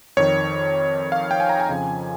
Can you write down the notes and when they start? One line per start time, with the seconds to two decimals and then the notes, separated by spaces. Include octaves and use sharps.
0.17 F2 D#3 C#5
1.12 F5
1.31 G5
1.40 G#5
1.49 A#5
1.60 G#5
1.69 F2 C#3 F3